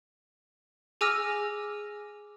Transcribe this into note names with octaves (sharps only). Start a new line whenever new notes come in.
G#4 G#5 D6 E6 F6 A#6